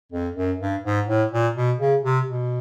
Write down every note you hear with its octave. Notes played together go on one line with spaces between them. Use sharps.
F2
F#2
G2
G#2
A2
A#2
B2
C#3
C3
B2